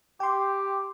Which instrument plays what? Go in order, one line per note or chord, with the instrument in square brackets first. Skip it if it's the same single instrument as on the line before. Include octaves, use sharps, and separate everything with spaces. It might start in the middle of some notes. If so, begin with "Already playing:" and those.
[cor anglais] G4 [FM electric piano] G5 C6